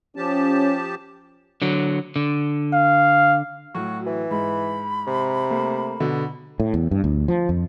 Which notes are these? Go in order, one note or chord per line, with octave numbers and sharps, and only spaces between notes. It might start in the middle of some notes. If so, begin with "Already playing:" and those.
F3 C#4 G4 A5
D3 F#3
D3
F5
A2 F#3 F#4
E3
G#2 B5
C3
A3 A#3
B2 D3
A2
E2
G2
D2
F3
F2